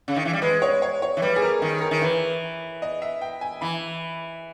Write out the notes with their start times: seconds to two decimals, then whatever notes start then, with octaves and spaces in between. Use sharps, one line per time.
0.08 C#3
0.16 D#3
0.25 E3
0.33 G3
0.42 G#3 B4
0.62 C#5
0.82 C#5
1.02 C#5
1.17 E3
1.22 G3 B4
1.36 G#4
1.42 A#4
1.62 D#3 G#4
1.81 A#4
1.91 D#3
2.02 E3 B4
2.82 D#5
3.02 E5
3.21 G5
3.41 G#5
3.61 E3 B5